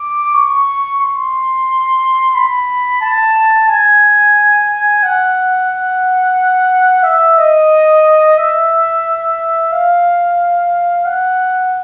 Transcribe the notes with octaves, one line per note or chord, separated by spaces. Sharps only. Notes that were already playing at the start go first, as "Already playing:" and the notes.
Already playing: D6
C#6
C6
B5
A5
G#5
F#5
E5
D#5
E5
F5
F#5